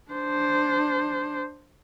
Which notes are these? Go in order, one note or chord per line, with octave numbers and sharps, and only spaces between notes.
D4 C5